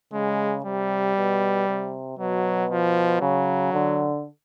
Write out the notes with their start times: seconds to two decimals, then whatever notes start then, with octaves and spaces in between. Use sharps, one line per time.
0.13 C#3 G#3
0.64 C3 G3
1.16 B2
1.68 C3
2.18 B2 F#3
2.70 F3
3.21 C#3 F#3
3.73 D3